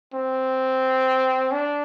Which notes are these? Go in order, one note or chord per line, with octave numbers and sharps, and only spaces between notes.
C4
D4